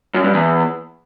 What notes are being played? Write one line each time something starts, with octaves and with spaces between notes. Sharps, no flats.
F#2
G2
E2